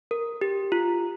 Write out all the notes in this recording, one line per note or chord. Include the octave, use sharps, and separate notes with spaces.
A#4
G4
F4